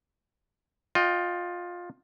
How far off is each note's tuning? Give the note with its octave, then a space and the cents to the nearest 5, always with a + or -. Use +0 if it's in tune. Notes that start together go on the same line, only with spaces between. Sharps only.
F4 +15 D#5 -10 G5 +0